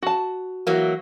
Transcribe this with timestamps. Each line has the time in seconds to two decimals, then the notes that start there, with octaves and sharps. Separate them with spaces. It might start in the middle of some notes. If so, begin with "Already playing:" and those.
0.03 F#4 A5
0.67 E3 F#3 A#3